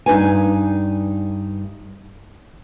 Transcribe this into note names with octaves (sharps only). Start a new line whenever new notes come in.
G2 D#4 B4 G#5